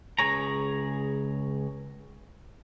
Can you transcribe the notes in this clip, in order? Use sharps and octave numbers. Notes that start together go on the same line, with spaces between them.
C#2 G#4 C#5 A#5